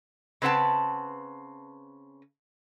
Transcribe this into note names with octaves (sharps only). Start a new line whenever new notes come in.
C#3 C4 B4 F#5 A5